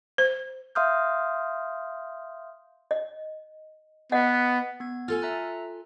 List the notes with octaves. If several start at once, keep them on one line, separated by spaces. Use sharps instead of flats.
C5
E5 F5 C6 D#6 F6 G6
D#5
B3 D#5 F#5
B3 G#6
F4 A4 G#5 F6 A6
E5 A#5 F#6